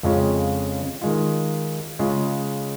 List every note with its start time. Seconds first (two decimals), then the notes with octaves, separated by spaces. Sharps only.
0.03 F2 C#3 G#3 C#4 F4
1.02 D#3 G#3 F4
1.99 C#3 G#3 F4